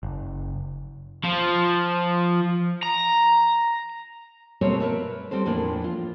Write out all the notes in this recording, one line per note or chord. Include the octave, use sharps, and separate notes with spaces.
F#1
F3
A#5
B2 G3 A3 A#3 C4 C#5
A#4 B4 E5 A5
G3 C4 A4 C5
E2 A2 F3 A#3 D4
F4